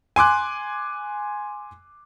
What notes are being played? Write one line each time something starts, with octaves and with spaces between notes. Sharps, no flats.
G#5 C6 D6 F#6